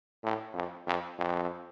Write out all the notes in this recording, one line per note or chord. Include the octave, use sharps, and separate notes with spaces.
A2
F2
F2
F2